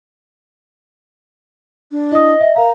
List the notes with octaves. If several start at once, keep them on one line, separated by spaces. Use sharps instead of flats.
D4
E4 D#5 D#6
E5
A#4 F5 A#5